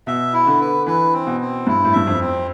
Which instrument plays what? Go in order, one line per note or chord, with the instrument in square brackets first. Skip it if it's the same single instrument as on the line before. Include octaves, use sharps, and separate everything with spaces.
[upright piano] B2 [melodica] E5
[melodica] E4
[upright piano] D3
[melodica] B4
[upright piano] E3 [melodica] B4
[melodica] C4
[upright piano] B2
[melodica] C4
[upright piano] G2 [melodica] E4
[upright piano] A2
[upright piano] G2 [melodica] E5
[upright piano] F2
[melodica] C4